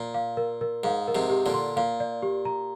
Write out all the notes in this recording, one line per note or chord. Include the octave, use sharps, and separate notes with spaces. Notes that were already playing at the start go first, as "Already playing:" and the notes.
Already playing: A#2
F5
A#4
A#4
G#2 F5
A#4
G#2 C3
G4
A#2 D3
C6
A#2 F5
D5
G4
A#5